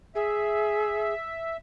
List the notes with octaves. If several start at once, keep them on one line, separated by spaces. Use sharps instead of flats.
G#4 E5